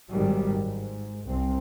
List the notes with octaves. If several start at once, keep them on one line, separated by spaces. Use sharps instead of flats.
G#1 G#2 D#3 F#3 G3
G#2
C2 C4